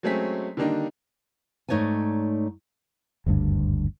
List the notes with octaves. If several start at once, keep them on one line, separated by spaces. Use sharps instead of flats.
F#3 G#3 A3 C4 C#4 B6
D3 D#3 G3 A#3 D4 D#4
G#2 A3 D#4 C#5 D5 G#5
F#1 D2 G2 D3